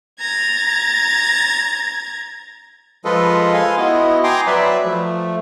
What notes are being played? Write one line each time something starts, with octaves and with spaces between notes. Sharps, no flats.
A#5 G#6 A6
F3 G#3 F4 A4 B4 D#5
F5 G#5 C6
B3 E4 F#4 D#5
G5 G#5 A#5 C6 D6 D#6
F#3 B4 D5 E5
F3 A3